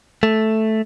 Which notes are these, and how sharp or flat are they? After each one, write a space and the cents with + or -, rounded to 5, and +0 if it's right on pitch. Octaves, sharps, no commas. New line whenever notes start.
A3 -5